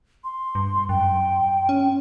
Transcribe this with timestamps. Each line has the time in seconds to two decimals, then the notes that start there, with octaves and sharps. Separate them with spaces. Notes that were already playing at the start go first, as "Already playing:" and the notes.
0.24 C6
0.55 G2
0.89 F#2 G5
1.69 C#4